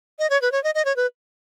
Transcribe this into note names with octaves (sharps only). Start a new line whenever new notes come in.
D#5
C#5
B4
C#5
D#5
D#5
C#5
B4